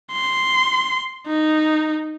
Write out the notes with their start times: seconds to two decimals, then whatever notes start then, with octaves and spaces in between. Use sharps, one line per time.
0.12 C6
1.27 D#4